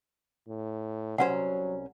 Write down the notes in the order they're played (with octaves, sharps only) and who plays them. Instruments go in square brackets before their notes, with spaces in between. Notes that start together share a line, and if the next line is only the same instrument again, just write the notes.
[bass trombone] A2
[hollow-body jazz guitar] C2 C#4 C5 [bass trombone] F#3 [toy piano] F#5